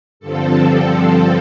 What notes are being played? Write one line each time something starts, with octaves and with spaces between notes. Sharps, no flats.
G2 D3 F3 C4 A4
A4
A4